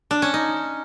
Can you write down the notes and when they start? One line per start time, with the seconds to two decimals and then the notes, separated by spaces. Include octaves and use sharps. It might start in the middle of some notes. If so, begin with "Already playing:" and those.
0.11 D4
0.22 C#4
0.34 D#4